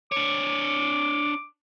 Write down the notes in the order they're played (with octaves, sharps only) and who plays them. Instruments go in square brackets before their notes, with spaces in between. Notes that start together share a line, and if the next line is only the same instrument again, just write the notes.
[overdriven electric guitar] D4 C#5 [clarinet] D6